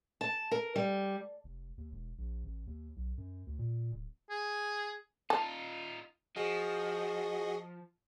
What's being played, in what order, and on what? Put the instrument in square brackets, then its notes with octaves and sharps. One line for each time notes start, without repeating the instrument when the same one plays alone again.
[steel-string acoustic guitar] A5
A#4
G3
[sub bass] F1
D#2
E1
A#1
A1
D#2
B1
F#2
D2
A#2
D1
[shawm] G#4
[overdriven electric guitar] D#4 F4 [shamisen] A5
[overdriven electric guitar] F3 [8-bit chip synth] F#4 G#4 D#5